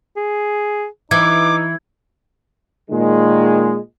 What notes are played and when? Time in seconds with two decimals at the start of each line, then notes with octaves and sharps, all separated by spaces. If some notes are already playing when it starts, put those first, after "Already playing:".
0.17 G#4
1.11 E3 D#4 D6 G#6
2.91 A#2 D#3 G#3